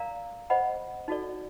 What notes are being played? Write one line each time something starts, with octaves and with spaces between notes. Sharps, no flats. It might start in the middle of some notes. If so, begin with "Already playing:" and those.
Already playing: A#4 D5 F5 A#5
C5 D#5 F#5 B5
D#4 F#4 A4 D5